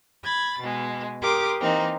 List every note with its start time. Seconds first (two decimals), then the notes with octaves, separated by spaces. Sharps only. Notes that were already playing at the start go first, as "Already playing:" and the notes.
0.23 B5 G#6 A6
0.60 B2 G#3
1.22 G4 A#4 C6 D6 D#6
1.60 E3 A#3 C4 D#4